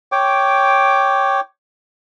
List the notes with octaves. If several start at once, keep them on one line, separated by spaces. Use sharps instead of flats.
C#5 G5 D6